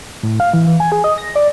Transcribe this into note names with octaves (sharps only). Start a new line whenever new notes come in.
A2
F5
E3
E3
G#5
G#4
D#5
A#6
D5